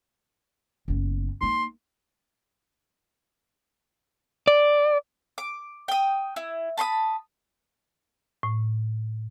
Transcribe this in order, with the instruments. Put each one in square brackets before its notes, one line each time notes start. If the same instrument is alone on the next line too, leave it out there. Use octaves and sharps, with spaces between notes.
[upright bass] F#1 B3
[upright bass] A#3 D#4 [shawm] C6
[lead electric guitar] D5
[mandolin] D6
G5 D#6
E4
A5 B5 C6 D#6
[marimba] A2